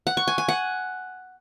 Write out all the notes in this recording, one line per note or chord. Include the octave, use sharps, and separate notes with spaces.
F#5
C#6
G#5
G#5
F#5